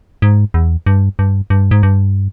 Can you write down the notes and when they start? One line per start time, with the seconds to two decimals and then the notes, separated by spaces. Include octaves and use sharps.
0.22 G#2
0.54 E2
0.86 G2
1.19 G2
1.50 G2
1.71 G#2
1.83 G2